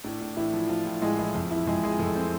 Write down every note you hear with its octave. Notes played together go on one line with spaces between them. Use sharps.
A2 D4
A2
A2 E3 E4
F3
F3 F4
A2
A2 G#3 G#4
E3 F3 E4
F2
E3 F3 E4
F2 G#3 G#4
F3 G#3 G#4
F2 A3 A4
C4 C5